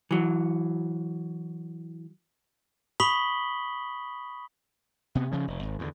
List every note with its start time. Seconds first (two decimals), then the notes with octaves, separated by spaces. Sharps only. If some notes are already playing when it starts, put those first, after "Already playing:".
0.11 E3 F#3
3.00 B5 C#6 D#6 B6 F#7 G7
5.15 C3 B3
5.32 C#3 F3 C#4
5.47 F1
5.63 G#1
5.79 E2 G2 D3